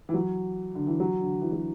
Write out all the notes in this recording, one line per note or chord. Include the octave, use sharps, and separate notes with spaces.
E3
F#3
D3
E3
F#3
D3
E3
F#3